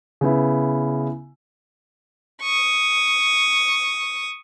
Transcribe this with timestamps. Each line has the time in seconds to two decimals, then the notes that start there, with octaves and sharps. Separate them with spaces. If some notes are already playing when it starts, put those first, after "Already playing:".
0.21 C#3 B3 E4
2.42 C#6 D#6